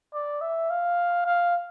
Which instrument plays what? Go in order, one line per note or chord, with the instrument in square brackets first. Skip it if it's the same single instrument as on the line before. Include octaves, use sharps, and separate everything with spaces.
[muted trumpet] D5
E5
F5
F5